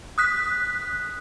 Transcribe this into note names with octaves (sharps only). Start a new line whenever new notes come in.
D#6 F#6 B6